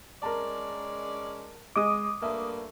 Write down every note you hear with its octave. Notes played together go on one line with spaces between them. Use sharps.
G#3 C#4 A#4 D5 A5
G#3 D#5 D6 D#6
G2 A3 A#3 E5